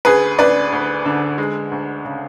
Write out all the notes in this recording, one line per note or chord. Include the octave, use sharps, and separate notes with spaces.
D2 G#4 B4
D2 B4 D5
D2
D3
G#3
D2
C#3